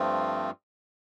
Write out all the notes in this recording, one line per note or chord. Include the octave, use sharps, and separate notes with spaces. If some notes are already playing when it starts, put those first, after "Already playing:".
Already playing: G2 F3 A3 C4 F4